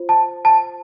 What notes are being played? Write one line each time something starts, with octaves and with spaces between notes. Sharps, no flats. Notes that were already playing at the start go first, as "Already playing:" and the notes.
Already playing: F4 C5
A5
A5